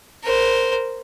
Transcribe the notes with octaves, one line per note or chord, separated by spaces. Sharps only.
A#4 C5